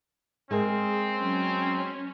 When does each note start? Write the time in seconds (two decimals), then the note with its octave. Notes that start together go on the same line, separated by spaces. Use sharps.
0.51 G#3 C4 G#4 A#4
1.17 F#3 C#4